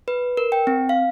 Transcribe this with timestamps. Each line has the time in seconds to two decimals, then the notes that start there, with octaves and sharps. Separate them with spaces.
0.08 B4
0.37 A#4
0.52 G5
0.67 C4
0.89 F5